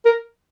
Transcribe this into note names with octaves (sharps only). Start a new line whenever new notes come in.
A#4